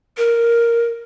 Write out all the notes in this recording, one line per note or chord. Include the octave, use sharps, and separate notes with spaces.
A#4